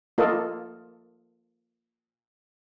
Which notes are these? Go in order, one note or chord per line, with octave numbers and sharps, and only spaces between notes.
A#3 F4 A4 A#4 D#5